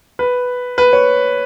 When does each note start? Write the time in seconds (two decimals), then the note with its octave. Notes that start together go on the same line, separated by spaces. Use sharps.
0.19 B4
0.78 B4
0.93 C#5